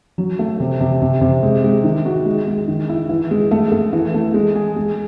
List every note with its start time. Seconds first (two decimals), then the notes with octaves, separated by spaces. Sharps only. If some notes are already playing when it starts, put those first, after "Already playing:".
0.18 F#3
0.39 A3
0.60 C3
0.80 C3
1.02 C3
1.21 C3
1.43 G#3
1.64 G#3
1.84 D#3
2.06 F#4
2.26 G#3
2.47 G#3
2.68 D#3
2.89 E4
3.09 E3
3.31 G#3
3.51 A3
3.72 A3
3.93 E3
4.14 A3
4.34 G#3
4.56 G#4
4.76 G#3